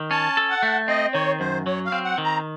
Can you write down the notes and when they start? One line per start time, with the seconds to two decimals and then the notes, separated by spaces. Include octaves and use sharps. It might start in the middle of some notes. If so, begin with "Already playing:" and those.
Already playing: D#3
0.11 C#4 A5
0.37 A4
0.50 F#5
0.63 A3
0.88 C4 D#5
1.14 D#3 C#5
1.40 F#2 C5
1.66 F#3 C#5
1.85 F5
1.92 C4
2.04 F#5
2.18 D#3
2.24 A#5